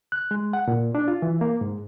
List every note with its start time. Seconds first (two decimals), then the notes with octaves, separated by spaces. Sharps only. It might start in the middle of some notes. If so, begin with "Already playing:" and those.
0.12 F#6
0.31 G#3
0.53 F#5
0.68 A#2
0.95 D4
1.08 F4
1.22 E3
1.41 A#3
1.61 G#2